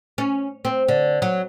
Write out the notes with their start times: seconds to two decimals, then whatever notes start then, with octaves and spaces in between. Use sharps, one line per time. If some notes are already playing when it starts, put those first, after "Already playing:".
0.18 C#4
0.65 C4
0.88 D3
1.22 F#3